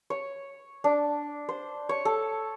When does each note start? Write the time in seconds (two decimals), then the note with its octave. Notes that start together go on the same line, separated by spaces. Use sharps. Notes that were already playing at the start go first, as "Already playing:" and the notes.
0.10 C#5
0.84 D4
1.49 C5
1.89 C#5
2.05 A4